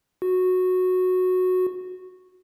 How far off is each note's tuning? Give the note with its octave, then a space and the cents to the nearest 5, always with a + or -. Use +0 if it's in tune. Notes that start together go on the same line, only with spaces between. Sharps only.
F#4 -10